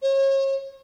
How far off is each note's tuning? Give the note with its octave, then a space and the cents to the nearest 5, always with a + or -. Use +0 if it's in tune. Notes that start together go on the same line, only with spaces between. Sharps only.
C#5 -35